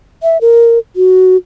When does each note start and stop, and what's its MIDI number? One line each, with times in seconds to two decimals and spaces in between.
0.23 0.40 76
0.41 0.79 70
0.96 1.37 66